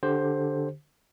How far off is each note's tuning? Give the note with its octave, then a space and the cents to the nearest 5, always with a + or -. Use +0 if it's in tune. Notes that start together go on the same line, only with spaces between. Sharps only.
D3 +0 G4 +5 C5 +10